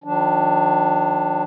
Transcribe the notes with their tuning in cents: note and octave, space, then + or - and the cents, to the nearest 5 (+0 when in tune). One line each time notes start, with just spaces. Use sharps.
D#3 +0 F#3 -45 D4 +0